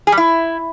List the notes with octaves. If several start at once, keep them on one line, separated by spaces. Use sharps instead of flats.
G#4
G3
E4